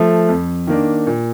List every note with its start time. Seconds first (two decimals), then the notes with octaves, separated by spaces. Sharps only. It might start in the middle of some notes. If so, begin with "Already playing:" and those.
Already playing: F3 A3
0.29 F2
0.67 D#3 A#3 D4
1.07 A#2